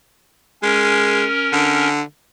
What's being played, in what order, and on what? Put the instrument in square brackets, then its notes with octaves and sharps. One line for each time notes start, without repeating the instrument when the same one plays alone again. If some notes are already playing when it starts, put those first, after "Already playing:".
[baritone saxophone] G#3 [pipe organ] C#4 A#4
[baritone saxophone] D3